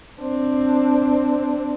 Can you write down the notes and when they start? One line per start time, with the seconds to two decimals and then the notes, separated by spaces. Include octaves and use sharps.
0.21 C4 D4